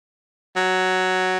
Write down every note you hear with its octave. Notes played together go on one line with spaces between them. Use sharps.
F#3